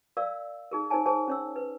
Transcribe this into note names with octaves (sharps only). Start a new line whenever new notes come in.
A#4 D5 F5 E6
D#4 G#4 A#4
D#4 A#4 C5 C#5 G#5 A5
G#4 A#4 C5 C#5 G#5 A5
C#4 C#5 E6
B4